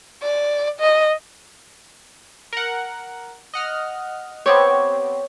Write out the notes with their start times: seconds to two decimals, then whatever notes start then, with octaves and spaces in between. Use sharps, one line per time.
0.22 D5
0.80 D#5
2.53 A#4 F#5
3.54 D#5 F#5 F6
4.46 B3 C4 G4 C#5